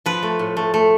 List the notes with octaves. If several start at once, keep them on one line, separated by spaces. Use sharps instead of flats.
F3 B4
A3
A2
A3
A3